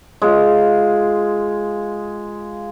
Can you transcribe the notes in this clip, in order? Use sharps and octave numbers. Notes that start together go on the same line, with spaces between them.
G#3 F4